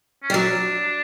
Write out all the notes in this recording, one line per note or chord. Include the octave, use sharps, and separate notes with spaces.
C#4
G3
F#3 D4